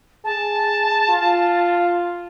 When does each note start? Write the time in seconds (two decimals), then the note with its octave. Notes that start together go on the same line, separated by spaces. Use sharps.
0.25 G#4 A5
1.10 F4